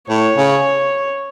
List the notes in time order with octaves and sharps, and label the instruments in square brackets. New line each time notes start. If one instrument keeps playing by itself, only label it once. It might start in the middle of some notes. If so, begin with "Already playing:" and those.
[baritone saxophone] A2 [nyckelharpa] C#5
[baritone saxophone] C#3